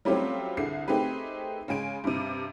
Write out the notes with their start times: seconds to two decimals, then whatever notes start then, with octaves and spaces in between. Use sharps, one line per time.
0.05 F#3 G3 A3 C4 C#4 F4
0.57 C2 D3 G#4 C7
0.88 A3 C4 D#4 G4 G#4 B4
1.68 C#3 G#3 G#5 D7
2.04 G2 C3